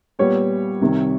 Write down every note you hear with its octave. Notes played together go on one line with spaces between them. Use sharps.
A#2 G3 B3 C#5
C2 C3 D#3